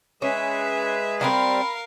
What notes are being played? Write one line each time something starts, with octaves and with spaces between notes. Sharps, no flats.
G#3 C#4 G#4 B4 E5
G3 B3 C4 A#4 F5 B5